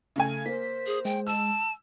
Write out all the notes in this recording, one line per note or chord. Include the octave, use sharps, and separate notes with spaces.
C#3 A3 G#5
A#3 C5 B6
G#4
G#3 G5
A5 E6